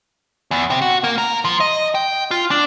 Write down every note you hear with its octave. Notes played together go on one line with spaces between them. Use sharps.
E2
C3
F#4
A#3
A#4
F3
D#5
G5
F4
D4